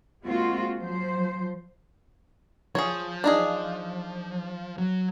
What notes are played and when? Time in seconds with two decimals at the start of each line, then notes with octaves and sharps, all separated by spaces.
0.25 G#3 A#3 C4 F4 F#4
0.79 F3 F#3 C5
2.75 F3 G#4 C#5
3.24 D4 D#4 G#4
4.78 F#3